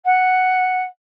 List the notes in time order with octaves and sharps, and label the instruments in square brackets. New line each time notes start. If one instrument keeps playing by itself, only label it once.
[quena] F#5